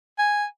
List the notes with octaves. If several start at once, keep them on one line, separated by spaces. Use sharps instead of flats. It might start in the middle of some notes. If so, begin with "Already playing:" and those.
G#5